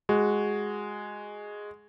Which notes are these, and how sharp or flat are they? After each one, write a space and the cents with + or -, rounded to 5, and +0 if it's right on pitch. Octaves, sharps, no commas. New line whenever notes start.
G#3 +0 F#4 +0